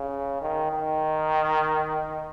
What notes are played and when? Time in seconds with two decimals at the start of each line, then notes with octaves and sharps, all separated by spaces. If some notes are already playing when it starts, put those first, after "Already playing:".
Already playing: C#3
0.42 D#3
0.71 D#3